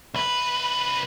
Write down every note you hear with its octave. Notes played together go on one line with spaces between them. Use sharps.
C2 B4